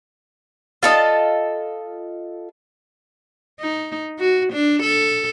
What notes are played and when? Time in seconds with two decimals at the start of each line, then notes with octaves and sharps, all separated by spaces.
0.83 F4 A4 D#5
3.60 D#4
4.19 F#4
4.53 D4
4.83 A4